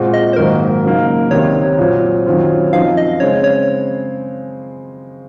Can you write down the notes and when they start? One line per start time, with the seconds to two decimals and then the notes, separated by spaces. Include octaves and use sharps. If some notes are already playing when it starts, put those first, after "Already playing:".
Already playing: A#2 G#3 C4 F#4
0.14 D#5
0.33 C5
0.36 G#2 D#3 F#3 A#3 A#4
0.84 C#3 F#3 A#3 D#4
1.31 C2 C3 D#3 C#5
1.78 A#2 F#3 C4
2.26 F#2 D#3 F#3 C4 F4
2.73 F#2 F3 C4 D#4 F5
2.97 D#5
3.20 C#3 G#3 C4 C#5
3.44 C#5